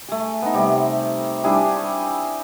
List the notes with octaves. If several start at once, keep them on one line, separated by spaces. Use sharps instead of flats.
A3 G#4
B3 D#4
C3 G3
G3 D4 E4 G#4
C#6